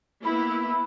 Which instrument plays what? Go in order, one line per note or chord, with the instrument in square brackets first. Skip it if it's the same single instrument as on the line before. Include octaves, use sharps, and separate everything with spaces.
[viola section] A#3 B3 E4 [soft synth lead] B5